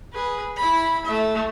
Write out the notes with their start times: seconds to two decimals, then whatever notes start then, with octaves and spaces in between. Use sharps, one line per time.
0.13 G#4 B4
0.56 E4 B5
1.05 A3 E5